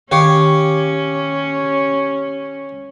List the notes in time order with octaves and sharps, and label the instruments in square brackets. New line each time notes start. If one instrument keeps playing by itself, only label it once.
[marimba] D#3 [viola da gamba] C#4 [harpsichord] G4 C#5 F5